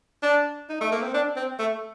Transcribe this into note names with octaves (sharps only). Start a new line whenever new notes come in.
D4
D#4
A3
A#3
C4
D4
C4
A3